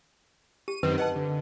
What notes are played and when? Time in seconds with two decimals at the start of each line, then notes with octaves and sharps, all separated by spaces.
0.68 G4 D#7
0.83 F#2 D#3 C4 B4
0.98 B4 D#5 F#5 A5
1.16 D3